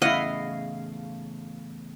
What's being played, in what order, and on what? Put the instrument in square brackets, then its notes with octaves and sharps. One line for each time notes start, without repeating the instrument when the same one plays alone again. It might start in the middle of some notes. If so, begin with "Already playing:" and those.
[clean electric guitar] E2 A2 C#3 [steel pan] E4 F#5 [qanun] D#5 [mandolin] F5